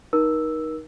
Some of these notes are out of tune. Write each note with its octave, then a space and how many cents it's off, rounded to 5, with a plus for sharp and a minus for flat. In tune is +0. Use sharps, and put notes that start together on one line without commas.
D#4 +0 A#4 +35 E6 +0